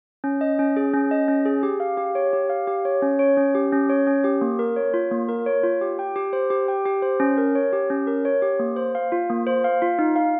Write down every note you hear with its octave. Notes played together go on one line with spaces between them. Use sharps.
C#4
D#5
C#4
G#4
C#4
D#5
C#4
G#4
G4
F5
G4
C#5
G4
F5
G4
C#5
C#4
C#5
C#4
G4
C#4
C#5
C#4
G4
A#3
A#4
C#5
F4
A#3
A#4
C#5
F4
G4
G5
G4
C5
G4
G5
G4
C5
C#4
A#4
C#5
G4
C#4
A#4
C#5
G4
A#3
C5
F5
F4
A#3
C5
F5
F4
D#4
F5